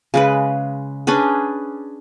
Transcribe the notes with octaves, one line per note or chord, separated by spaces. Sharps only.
C#3 G#3 B4
C#4 D4 G#4 B4